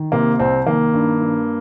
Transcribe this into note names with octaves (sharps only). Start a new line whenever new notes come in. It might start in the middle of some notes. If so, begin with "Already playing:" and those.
Already playing: D#3
C3 A#3
C2 C4
D#3 A#3
G2
G2